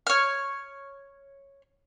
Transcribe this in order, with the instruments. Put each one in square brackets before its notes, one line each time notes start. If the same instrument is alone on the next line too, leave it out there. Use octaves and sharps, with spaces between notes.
[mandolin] C#5 F6